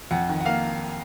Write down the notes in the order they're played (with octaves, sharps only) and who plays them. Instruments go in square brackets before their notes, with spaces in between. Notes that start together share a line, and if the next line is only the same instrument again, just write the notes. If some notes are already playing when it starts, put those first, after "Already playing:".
[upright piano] F2 F#5
D#3
F#5
A#3 F5